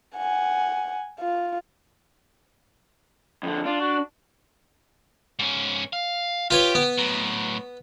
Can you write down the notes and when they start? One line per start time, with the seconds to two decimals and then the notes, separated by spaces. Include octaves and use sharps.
0.17 F#5 G#5
1.20 F4
3.43 F2 D3
3.65 D4 F4
3.80 F#4
5.39 G#2 C#4
5.93 F5
6.50 F4 G4 B4 C#5
6.75 B3
6.98 A2 F#3